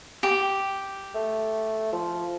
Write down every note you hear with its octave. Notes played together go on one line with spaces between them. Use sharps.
G4
A3
F3